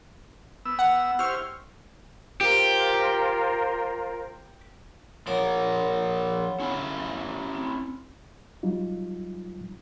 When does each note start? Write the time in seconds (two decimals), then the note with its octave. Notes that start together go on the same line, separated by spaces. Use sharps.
0.65 B3 E6
0.79 F#5
1.19 E4 G4 C5 C#6 F6
2.41 F4 G4 A#4 C5
5.27 F3 A#3 A#4 C#5 F#5
6.60 C#4 E4 F5
7.55 C4
8.63 F#3 G3 D#4 F4